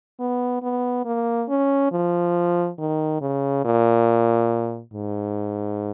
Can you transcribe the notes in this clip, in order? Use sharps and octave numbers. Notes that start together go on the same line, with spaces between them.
B3
B3
A#3
C#4
F3
D#3
C#3
A#2
G#2